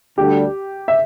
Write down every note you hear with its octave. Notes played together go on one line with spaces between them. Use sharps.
D2 D3 G3 D4 G4
E5